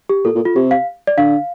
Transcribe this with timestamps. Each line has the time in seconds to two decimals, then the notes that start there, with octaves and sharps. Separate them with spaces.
0.09 G4
0.25 A#2 A4
0.35 A#2
0.45 F4
0.56 C3 G4
0.71 F5
1.07 D5
1.18 D3 F5